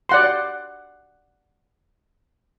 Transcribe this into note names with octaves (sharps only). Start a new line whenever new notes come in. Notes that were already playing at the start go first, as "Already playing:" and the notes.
D5 F#5 C6